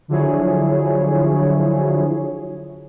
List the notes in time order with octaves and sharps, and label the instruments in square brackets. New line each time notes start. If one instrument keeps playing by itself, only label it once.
[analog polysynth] D3 F3 F#3 E4 G#4 C#5